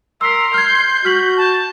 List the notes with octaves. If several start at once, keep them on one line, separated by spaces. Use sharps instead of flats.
A#4 C6 E6 B6
F6 G6 G#6
F#4 F6 B6 F#7
A5